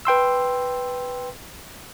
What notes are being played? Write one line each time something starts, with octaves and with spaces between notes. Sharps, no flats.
B4 G5 C6 E6